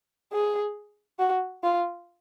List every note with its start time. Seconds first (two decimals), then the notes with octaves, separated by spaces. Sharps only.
0.32 G#4
1.19 F#4
1.63 F4